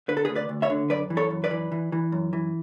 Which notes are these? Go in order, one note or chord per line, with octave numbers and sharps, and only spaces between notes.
D3 B4
A4
G#4 B4
D2
B4 D5
D2
C#5 E5
D3
F#2 B4 D5
E3
A4 C#5
F#2
B4 D5
E3
E3
E3
F#2
E3